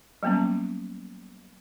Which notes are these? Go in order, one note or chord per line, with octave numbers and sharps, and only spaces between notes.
F#3 G3 A#3 B3 C#4